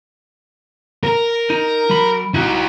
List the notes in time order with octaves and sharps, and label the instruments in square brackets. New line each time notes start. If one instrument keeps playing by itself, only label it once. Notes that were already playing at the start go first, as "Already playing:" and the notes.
[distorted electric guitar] A#4
[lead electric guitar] D#4
F#3 B5
[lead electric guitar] D#4 F#4 [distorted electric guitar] E4 G4